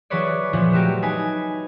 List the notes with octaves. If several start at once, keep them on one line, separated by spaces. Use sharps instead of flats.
E3 F#3 G#4 B4 C#5 D5
A#2 E3 F3 B3
A3 F#4 G4 A#4
D#4 B4 G#5